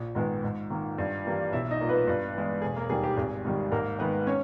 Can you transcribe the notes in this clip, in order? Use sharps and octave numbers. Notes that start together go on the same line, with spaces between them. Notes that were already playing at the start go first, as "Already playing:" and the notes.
Already playing: A#1
G#2 D#3 G#3 B3
G#2
D#3 A#3
G2
E3 G3 A#3
B1 E4 E5
D#4 D#5
A#2 A#3
B3 B4
G2
E3 G#3 B3
E1 G#4
A#3 A#4
D#2 D#3 G3 A#3 G#4
G4
G#1 G#4
G#2 D#3 G3
G#2 A#3 A#4
D#3 G#3 B3 B4
C#4 C#5